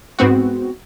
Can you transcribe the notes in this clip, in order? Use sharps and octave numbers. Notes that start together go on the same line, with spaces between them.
G#2 B3 C4 F#4